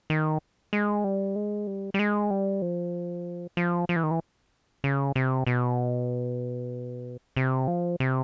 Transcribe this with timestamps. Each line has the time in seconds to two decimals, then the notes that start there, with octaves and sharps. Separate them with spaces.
0.10 D#3
0.73 G#3
1.04 G3
1.36 G#3
1.67 G3
1.94 G3
1.99 G#3
2.31 G3
2.62 F3
3.57 F3
3.89 F3
3.96 E3
4.03 D#3
4.11 E3
4.84 C#3
5.15 C3
5.47 B2
7.37 C3
7.68 F3
8.00 C3